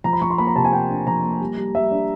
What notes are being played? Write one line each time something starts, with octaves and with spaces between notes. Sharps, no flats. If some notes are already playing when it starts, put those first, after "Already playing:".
F3 A#5
B5
F3 C#6
C6
A#3 B5
A#5
C3 A5
G#5
A#3 G5
D4
F3 A#5
A#3
G3
G3
G3 E5
D4